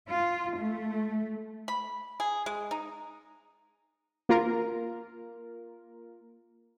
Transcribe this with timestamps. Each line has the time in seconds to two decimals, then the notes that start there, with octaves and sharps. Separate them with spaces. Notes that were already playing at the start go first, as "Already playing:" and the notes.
0.11 F4
0.57 A3
1.68 B5
2.20 G#4
2.46 G#3
2.71 D#4
4.29 A#3 F4 A#4